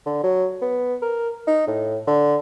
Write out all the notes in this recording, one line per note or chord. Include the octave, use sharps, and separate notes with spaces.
D3
F#3
B3
A#4
D#4
A2
D3